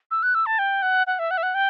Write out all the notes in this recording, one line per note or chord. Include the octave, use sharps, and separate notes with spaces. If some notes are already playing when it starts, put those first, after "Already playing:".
E6
F#6
E6
A5
G5
F#5
F#5
E5
F#5
E5
F#5
G5